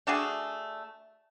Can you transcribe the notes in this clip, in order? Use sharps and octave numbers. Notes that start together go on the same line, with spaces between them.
A3 D4 F#4 G#4